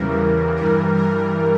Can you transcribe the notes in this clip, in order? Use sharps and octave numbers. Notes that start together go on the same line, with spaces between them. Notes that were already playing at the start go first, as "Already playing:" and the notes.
Already playing: E2 C#3 E3 G3 A#4
G2 E3 G3 A#4
A#4